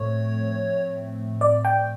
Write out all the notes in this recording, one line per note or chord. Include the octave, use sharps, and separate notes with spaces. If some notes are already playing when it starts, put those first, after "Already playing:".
Already playing: A2 F3 A3 C4 C#5
D5
G5